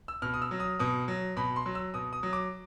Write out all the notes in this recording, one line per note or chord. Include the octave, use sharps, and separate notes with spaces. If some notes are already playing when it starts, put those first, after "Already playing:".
E6
B2 F6
D#6
E6
F#3
D#6
B2 D#6
F#3
B2 B5
C6
F#3
E6
B2 D#6
D#6
F#3
D6